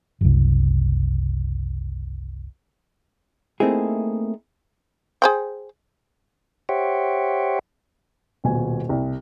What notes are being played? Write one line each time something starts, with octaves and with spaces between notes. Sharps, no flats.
F#1 C2
A3 A#3 C4 D#4 E4 G#4
G#4 C5 G5
G4 C5 C#5 E5 F#5 G5
D#1 B2 G#5
C2